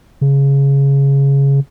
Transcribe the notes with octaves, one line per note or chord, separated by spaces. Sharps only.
C#3